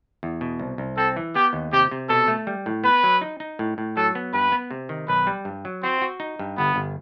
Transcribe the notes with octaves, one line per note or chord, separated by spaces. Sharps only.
E2
B2
C2
C2
C4 A4
E3
B3 G4
D#2
C3 G4
C3
B2 A4
A3
G3
A2
B3 B4
F#3
D#4
D#4
A2
A2
F#3 A4
B3
G2 B4
B3
C3
D#3
B1 B4
G3
G2
F#3
C4 F#4
F#4
D#4
G2
G1 B3
G1